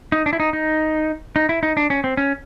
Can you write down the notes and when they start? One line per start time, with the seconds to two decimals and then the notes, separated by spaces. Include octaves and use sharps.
0.12 D#4
0.26 D4
0.33 E4
0.40 D#4
0.53 D#4
1.36 D#4
1.49 E4
1.63 D#4
1.77 D4
1.90 C#4
2.04 C4
2.17 C#4